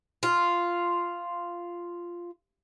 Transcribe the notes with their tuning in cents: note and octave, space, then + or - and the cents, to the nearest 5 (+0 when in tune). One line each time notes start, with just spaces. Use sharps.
F4 -5